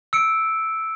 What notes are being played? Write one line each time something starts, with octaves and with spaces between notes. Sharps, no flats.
E6 C#7 D7